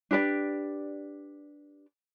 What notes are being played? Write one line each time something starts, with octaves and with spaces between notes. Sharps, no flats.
D4 G4 B4 D5